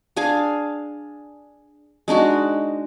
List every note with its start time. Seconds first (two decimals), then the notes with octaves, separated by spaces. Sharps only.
0.16 D4 G#4 F5 G#5
2.08 G#3 D4 D#4 F#4